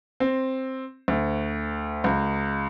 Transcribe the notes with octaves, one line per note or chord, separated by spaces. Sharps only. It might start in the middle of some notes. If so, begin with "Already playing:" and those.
C4
D2
C#2